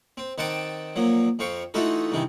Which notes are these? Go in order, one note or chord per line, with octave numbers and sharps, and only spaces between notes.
C4
D#3 C4 F#5 G5 A5 D6
A#2 F3 F#3
F2 C4 F5 C#6
E3 A3 D#4 F4 F#4 A4
G2 C3 D#3 E3